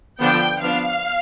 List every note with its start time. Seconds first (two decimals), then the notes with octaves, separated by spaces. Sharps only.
0.20 D3 F3 B3 D4 G5
0.61 F3 B3 D4 F5